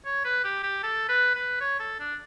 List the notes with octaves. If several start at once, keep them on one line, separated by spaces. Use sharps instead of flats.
C#5
B4
G4
G4
A4
B4
B4
C#5
A4
D4